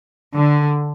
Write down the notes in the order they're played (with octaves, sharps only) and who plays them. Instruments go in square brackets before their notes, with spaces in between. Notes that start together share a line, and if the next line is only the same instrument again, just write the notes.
[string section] D3